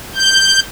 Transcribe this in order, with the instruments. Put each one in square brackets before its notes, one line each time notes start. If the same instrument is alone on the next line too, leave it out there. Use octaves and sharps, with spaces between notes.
[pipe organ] G6